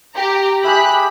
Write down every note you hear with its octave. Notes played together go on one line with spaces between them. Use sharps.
G4 A#5
G4 G#4 E5 B5 F#6